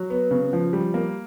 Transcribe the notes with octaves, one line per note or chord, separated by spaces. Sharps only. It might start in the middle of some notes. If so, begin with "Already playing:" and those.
Already playing: F#3
B3
C#3
F3
G3
A#3